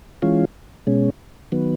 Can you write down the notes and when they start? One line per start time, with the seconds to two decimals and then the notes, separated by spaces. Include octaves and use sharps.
0.22 E3 G#3 C#4 F4
0.87 B2 G#3 C#4
1.52 D#3 F#3 B3